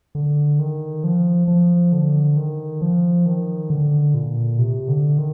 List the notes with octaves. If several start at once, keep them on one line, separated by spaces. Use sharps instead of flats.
D3
D#3
F3
F3
D3
D#3
F3
D#3
D3
A#2
C3
D3
D#3